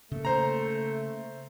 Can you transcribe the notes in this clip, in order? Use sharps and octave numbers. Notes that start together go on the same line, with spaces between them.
C#3 A3 A#3
C5 A#5